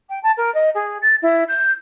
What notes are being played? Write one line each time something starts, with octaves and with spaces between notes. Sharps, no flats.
G5
A5
A#4
D#5
G#4
A6
E4
G6